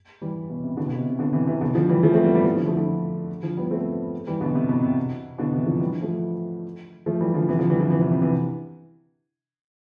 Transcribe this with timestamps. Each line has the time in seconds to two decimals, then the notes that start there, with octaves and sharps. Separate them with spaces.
0.22 E3 G3
0.49 B2
0.63 C3
0.77 B2 D3
0.88 B2 D3
0.98 C3
1.09 C3
1.19 B2 D3
1.33 C3 E3
1.47 C3 E3
1.61 B2 D3
1.75 D3 F3
1.89 E3 G3
2.03 F3 A3
2.14 A3 C4
2.24 G3 B3
2.35 G3 B3
2.45 E3 G3
2.56 D3 F3
2.66 F3 A3
2.77 D3 F3
3.43 D3 F3
3.57 G3 B3
3.71 A3 C4
4.27 E3 G3
4.41 B2 D3
4.55 C3
4.69 B2
4.83 C3
5.38 B2 D3
5.53 C3 E3
5.66 D3 F3
5.80 E3 G3
6.01 F3 A3
7.06 F3 A3
7.20 E3 G3
7.34 D3 F3
7.49 C3 E3
7.59 D3 F3
7.69 E3 G3
7.79 D3 F3
7.90 C3 E3
8.01 C3 E3
8.11 C3
8.22 C3 E3